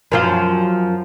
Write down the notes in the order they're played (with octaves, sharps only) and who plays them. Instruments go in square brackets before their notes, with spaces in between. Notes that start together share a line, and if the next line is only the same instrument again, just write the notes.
[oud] F#2 F3 F4